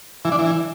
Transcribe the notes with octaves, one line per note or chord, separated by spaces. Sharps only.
E3
D4
E3